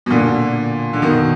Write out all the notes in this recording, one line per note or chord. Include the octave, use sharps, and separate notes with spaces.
B2
A#2 D3
D3
B2 D#3